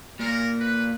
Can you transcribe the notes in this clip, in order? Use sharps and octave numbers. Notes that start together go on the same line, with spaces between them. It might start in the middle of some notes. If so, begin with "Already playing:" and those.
A#2 A#4
B4